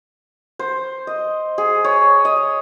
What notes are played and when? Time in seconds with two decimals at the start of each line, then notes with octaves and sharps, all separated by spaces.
0.59 C5
1.07 D#5
1.58 G#4
1.84 C#5
2.25 D#5